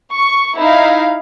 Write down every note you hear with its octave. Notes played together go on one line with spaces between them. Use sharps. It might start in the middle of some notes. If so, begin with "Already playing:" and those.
C#6
D#4 E4 F5